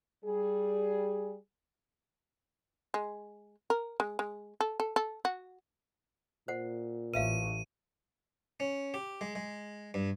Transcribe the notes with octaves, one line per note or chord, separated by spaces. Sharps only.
G3 G#4
G#3
A#4
G#3
G#3
A4
A4
A4
F#4
A#2 C5 F#5
A1 B4 E5 F5 D#7
C#4
G4
G#3
G#3
G2